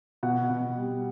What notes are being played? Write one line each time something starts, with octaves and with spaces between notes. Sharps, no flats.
B2 F#5
B2
G3